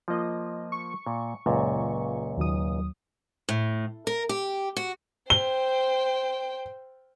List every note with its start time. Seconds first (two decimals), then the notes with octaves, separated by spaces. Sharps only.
0.08 F3 A#3 F4 D#5
0.72 C#6
1.07 A#2
1.46 C#2 F#2 A#2
2.37 D#2 F#3 D#6
3.49 A2
4.07 A#4
4.29 G4
4.77 F#4
5.30 C5 G5 G7